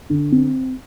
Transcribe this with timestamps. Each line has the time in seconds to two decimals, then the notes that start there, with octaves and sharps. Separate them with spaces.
0.10 D3
0.32 C4